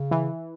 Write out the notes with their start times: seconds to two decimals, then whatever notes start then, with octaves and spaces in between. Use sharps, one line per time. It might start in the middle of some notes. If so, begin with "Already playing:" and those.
Already playing: C#3
0.11 E3